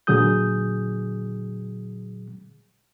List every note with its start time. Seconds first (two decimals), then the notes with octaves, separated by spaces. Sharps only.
0.07 A#2 D3 F#3 G#4 D#6 G6